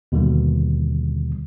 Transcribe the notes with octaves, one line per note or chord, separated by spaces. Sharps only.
D#2 B2 D3 D#3 G3